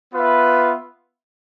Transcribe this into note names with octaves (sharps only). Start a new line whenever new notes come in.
B3 F4 B4 E5